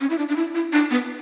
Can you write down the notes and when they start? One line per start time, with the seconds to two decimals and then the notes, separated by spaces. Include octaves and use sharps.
0.01 C#4
0.10 E4
0.18 D4
0.29 D4
0.36 E4
0.55 E4
0.73 D4
0.91 B3